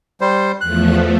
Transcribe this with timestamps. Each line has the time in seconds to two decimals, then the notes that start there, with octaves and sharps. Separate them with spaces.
0.21 G3 C5
0.61 E2 F3 A3 F#6